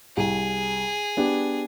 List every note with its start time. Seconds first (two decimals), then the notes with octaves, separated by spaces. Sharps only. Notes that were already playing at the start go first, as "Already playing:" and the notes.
0.17 C2 G#4
1.17 B3 D4 G4